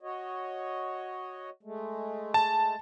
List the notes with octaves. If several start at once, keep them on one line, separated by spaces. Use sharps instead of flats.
F#4 C#5 D#5
G#3 A3
A5